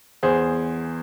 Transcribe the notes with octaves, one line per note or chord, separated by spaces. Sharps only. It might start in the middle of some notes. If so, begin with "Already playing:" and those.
E2 G#4 C5